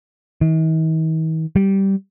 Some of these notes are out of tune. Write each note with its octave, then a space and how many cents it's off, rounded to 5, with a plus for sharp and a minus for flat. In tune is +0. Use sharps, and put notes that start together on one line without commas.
D#3 +45
G3 -10